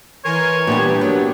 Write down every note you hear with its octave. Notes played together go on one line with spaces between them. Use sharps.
E3 A#4 C#5 G#5 C6
A#2 G3 B3 D4 G4
F#3 A#3